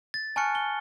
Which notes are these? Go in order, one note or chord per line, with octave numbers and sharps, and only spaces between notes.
A6
G#5 A5 C#6 F6 F#6 C#7
G7